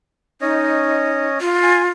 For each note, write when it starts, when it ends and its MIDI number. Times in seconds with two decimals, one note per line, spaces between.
0.41 1.39 61
0.41 1.26 63
0.41 1.39 73
0.41 1.39 75
1.41 1.89 65
1.63 1.82 80